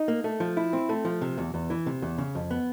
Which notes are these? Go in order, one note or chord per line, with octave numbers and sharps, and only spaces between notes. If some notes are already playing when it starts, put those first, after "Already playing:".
Already playing: D#4
A#3
A3
F3
E4
C4
A3
F3
C3
E2
E2
E3
C3
E2
C#3
F2
B3